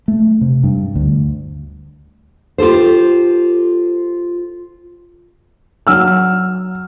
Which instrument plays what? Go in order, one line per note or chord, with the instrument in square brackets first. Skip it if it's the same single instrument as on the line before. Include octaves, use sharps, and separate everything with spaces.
[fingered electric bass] A3
C3
G2
D2
[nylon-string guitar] F4 G4 A4 C5
[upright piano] F#3 E6 F6